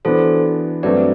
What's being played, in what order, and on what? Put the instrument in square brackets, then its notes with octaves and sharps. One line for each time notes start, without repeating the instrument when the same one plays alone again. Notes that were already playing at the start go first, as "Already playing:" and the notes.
[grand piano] E3 B3 D4 F#4 [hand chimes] A4 C5
[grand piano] G2 F#3 A3 C4 F#4 [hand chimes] B4 D5